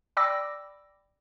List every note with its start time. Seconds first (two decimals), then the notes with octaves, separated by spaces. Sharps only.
0.17 D5 G5 B5 D6 E6 A#6